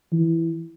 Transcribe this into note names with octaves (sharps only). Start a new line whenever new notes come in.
E3